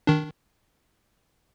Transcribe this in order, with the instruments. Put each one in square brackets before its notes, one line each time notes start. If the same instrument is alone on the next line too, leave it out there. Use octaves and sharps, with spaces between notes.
[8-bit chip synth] D#3 D4